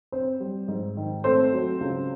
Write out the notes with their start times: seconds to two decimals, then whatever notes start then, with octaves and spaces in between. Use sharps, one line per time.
0.12 C4 C5
0.40 G3
0.68 G#2
0.97 D#3
1.24 A3 C4 C5
1.53 F#3
1.81 C#2